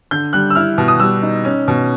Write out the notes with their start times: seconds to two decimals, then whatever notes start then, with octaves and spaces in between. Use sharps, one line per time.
0.11 D3 G6
0.33 G3 F#6
0.50 E6
0.55 E4 F6
0.78 B2
0.88 D#6
1.00 G3 E6
1.22 D#4
1.45 C#4
1.68 B2